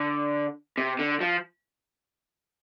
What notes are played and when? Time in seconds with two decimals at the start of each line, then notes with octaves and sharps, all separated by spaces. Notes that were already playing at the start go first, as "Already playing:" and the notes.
Already playing: D3
0.78 C3
0.99 D3
1.21 F3